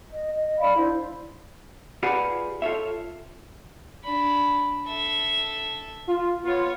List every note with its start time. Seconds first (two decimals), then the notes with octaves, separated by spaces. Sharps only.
0.11 D#5
0.33 D#5
0.59 D5 F5 B5
0.76 D4 E4 C5
2.03 F4 G4 G#4 B4 D5 F#5
2.62 F4 A4 C#5 E5
4.04 D4 B5
4.86 A4 E5
6.07 F4
6.44 B3 F4 C#5